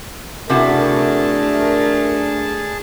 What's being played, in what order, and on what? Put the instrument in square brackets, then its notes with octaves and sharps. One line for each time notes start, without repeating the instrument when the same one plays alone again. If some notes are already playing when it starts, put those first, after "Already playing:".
[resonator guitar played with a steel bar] C3 E4 F#4 [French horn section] A3 D4 A#4 [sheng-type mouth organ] G#4 A5